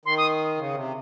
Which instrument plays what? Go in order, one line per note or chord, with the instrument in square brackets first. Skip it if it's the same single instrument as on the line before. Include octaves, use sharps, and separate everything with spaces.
[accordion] D#3 [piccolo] C6
[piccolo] D#6
[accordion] C#3
C3